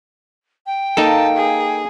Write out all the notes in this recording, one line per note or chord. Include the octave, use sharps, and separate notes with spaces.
G5
A#3 D#4 A4 A5
G#4